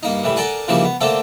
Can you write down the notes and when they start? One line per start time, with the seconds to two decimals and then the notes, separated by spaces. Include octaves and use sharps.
0.03 G2 A#3 D#4
0.24 A2 E3 G3
0.36 A4 A#4 D5 F#5 G#5
0.68 C#3 E3 F3 G3 A#3 D#4
0.85 B3
1.01 D3 A3 A#3 C4 A4